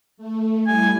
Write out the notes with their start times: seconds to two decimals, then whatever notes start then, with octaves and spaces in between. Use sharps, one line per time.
0.17 A3
0.67 G3 E4 G#5